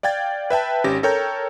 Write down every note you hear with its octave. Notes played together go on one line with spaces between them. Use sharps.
D5 F5 G5 G#6 A6
B4 E5 G5 A5
G#1 C#4 G4 A#6
A4 A#4 C#5 G5 A#5 G6